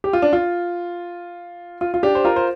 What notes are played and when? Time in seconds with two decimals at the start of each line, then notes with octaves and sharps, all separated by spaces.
0.04 G4
0.13 F4
0.22 D4
0.33 F4
1.81 F4
1.94 F4
2.03 D4 G4
2.15 C5
2.25 F4 A#4
2.36 C5